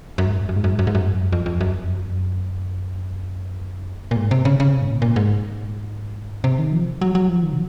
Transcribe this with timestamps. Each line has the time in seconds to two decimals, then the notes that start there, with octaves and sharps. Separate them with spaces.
0.18 F#2
0.26 G#2
0.33 F#2
0.41 G#2
0.49 F#2
0.56 G#2
0.64 F#2
0.72 G#2
0.79 F#2
0.87 G#2
0.95 F#2
1.32 F2
1.46 F2
1.61 F#2
1.75 F2
1.90 F#2
4.11 A#2
4.16 G#2
4.31 C3
4.45 C#3
4.60 C#3
4.74 C3
4.82 G#2
4.88 A#2
5.02 A#2
5.16 G#2
6.44 C3
6.59 D#3
6.72 F3
7.01 F#3
7.15 F#3
7.29 F3
7.43 D#3
7.53 C3